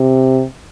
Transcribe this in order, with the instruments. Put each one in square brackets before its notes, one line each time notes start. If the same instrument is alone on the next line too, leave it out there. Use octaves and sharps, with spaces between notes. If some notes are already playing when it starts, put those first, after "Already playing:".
Already playing: [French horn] C3